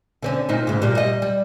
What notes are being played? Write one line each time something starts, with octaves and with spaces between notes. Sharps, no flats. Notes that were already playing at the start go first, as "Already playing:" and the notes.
D3 C4 C#4
A#2 C4 D#4
G#2 C#3
A#2 G3
G3 D#5
G3